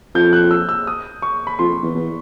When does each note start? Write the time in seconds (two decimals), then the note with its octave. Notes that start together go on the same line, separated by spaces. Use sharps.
0.15 F2 G6
0.33 F#6
0.51 E6
0.69 E6
0.87 D#6
1.22 C#6
1.47 B5
1.59 F2 C6
1.83 E2
1.95 E2